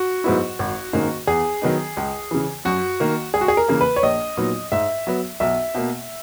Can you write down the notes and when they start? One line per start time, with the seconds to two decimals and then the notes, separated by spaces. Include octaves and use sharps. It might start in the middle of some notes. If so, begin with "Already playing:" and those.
Already playing: F#4
0.24 G#2 F#3 B3 E4
0.59 G#1
0.93 G#2 D#3 A#3 C#4
1.27 E2 G#4
1.62 D#3 F#3 B3 D#4
1.97 C#2
2.31 C#3 E3
2.65 F#2 F#4
3.00 D#3 A#3
3.34 C#2 G#4
3.41 F#4
3.48 G#4
3.57 A#4
3.68 C#3 E3 A#3
3.81 B4
3.96 C#5
4.03 A#1 D#5
4.37 A#2 F#3 B3 D#4
4.72 G#2 E5
5.07 F#3 B3
5.40 B1 E5
5.75 B2 A#3